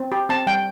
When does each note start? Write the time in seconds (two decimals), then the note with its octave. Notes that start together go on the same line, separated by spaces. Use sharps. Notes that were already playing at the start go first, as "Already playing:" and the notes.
Already playing: C4
0.12 G4
0.29 C4 A5
0.47 G3 G5